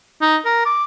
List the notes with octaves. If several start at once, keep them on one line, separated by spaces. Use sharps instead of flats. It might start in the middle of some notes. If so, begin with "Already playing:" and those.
D#4
A#4
D6